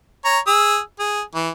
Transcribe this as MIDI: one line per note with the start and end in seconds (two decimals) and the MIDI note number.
0.25 0.39 73
0.25 0.39 82
0.47 0.79 68
0.47 0.79 88
0.99 1.21 68
1.35 1.50 52